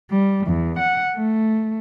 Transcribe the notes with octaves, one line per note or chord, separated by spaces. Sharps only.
G3
E2
F#5
A3